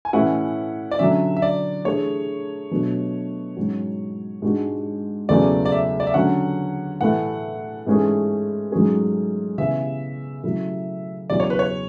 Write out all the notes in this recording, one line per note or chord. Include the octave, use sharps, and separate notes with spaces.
G#5
A2 E3 A3 C#4 E4 F#5
D5
D3 F#3 C#4 E5
E5
D5
E3 A3 D4 G#4 C#5
B2 F#3 A3 D4
G#2 F#3 C#4 F#4
G#2 G#3 D4 F#4
E2 C#3 F#3 A3 C#4 D5
D5
E5
D5
E5
D3 F#3 C#4 F#5
A2 E3 A3 F#5
G#2 E3 A3 C#4 G#4
G#2 F#3 A3 C#4 G#4
C#3 E3 B3 E5
C#3 F#3 A3 E4
E2 C#3 F#3 C#4 E4 D5
C#5
B4
C#5